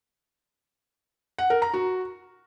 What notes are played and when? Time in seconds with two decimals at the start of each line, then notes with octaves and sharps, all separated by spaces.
1.38 F#5
1.50 A#4
1.62 A#5
1.74 F#4